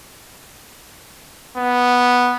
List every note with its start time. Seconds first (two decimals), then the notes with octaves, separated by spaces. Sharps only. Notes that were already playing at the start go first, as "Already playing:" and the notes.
1.57 B3